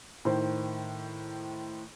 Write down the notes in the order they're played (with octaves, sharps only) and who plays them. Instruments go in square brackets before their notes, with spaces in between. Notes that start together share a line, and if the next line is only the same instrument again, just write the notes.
[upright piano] A2 D#3 C5